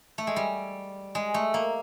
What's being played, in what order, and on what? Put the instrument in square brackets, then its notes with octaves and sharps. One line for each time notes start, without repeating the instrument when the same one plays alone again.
[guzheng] A3
G#3
G3
G#3
A3
A#3